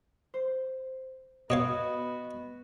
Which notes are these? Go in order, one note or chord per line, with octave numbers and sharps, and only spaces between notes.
C5
B2 B3 F#4 C#5 D#5 F5